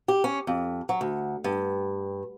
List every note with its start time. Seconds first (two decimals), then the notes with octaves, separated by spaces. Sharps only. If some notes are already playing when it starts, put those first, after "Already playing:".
0.08 G4
0.24 C#4
0.47 F2
0.89 F#3
1.01 D2
1.44 G2